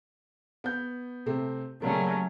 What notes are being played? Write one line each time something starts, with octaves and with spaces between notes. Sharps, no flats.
B3 G6
C3 A3 C4
C#3 F#3 G3 A3 A#3 C#4